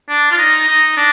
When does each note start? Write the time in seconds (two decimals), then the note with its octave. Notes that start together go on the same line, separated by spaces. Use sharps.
0.09 D4
0.31 F4
0.38 D#4
0.68 D#4
0.97 D4